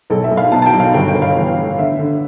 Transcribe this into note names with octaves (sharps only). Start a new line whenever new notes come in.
B1 A4
E5
B1
F5
B2 A5
A5
G5
B1
F5
G1 G5
G5
G1
F5
E3
A2
D3 E5
D3